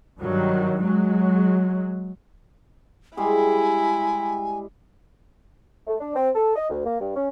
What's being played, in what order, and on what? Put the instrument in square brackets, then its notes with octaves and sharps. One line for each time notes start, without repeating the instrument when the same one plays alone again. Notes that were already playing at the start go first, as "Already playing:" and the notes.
[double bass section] G2 D#3 F#3
F#3 G#3
[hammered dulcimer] G3 G#3 G#4 [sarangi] E4 [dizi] G#5
[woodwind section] A3
D4
C4
A4
D#5
D2
A#3
G2
C#4